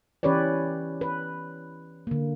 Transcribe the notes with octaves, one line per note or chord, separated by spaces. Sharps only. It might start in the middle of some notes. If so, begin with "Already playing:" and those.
E3 C#4 G4 B4 C#5 D5
B4
D3 A#3